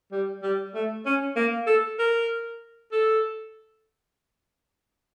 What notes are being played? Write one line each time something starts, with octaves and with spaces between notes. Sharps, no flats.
G3
G3
A3
C#4
A#3
A4
A#4
A4